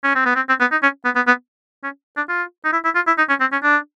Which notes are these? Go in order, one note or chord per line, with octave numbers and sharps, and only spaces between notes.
C#4
C4
B3
C4
C4
B3
D#4
C#4
B3
B3
B3
C#4
D4
F4
D#4
E4
E4
F4
E4
D#4
C#4
C4
C#4
D4